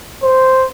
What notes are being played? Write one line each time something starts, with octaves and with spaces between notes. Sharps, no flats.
C5